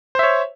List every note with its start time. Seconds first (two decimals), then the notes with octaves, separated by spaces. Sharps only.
0.15 C5
0.19 E5
0.23 C#5